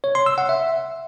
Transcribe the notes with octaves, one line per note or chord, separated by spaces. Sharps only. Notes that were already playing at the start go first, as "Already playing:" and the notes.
C#5
C6
E6
F#5
E5